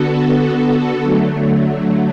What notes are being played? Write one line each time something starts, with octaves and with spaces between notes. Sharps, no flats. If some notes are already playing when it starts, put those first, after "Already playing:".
Already playing: D3 B3 F#4 A4
D3 F#3 A3